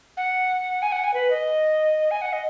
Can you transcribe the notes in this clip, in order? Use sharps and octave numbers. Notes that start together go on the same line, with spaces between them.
F#5
G#5
F#5
G#5
B4
D#5
G#5
F#5
D#5